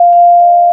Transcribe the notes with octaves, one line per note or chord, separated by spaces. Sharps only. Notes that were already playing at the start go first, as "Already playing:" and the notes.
Already playing: F5
F5
D#5